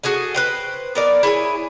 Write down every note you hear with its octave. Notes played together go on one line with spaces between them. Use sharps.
F#4 G#4 A4 G#5
B4 C5 G5
B3 A#4 D5
E4 G#4 C#5 G#5